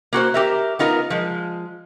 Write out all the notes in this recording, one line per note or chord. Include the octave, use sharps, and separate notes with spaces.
A#3 F#4 G#4 C5
G4 A#4 E5
B3 D#4 F4 A#4
F3 G#3